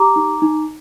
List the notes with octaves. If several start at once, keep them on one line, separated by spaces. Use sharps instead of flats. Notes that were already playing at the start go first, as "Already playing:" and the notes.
Already playing: G4 A#5 D6
D#4
D#4